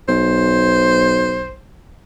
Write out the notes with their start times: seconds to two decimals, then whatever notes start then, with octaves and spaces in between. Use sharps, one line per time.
0.08 B1 C5